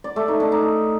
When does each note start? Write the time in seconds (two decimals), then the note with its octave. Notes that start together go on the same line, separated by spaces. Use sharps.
0.04 D5
0.16 A3
0.28 D#4
0.40 D4
0.52 D#4